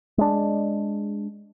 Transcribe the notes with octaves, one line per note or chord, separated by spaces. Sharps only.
G#3 D4